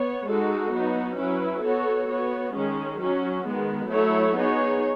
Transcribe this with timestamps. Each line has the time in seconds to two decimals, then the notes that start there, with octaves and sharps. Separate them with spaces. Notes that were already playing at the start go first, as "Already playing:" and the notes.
Already playing: B3 C#5
0.28 G#3 D#4 F#4 A4
0.74 F#3 B3 D#4 F#4
1.19 F#3 C#4 E4 B4
1.64 B3 F#4 A4 C#5
2.09 B3 F#4 C#5
2.54 D#3 G#3 C#4 G#4
3.00 F#3 C#4 F#4
3.45 D#3 G#3 B3
3.90 F#3 A3 E4 A4 C#5
4.36 B3 D#4 G#4 C#5